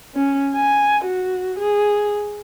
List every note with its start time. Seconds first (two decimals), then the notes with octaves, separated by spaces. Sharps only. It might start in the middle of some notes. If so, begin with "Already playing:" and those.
0.15 C#4
0.55 G#5
1.05 F#4
1.58 G#4